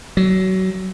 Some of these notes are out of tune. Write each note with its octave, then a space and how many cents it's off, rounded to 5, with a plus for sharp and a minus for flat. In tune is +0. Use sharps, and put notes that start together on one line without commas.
F#3 +25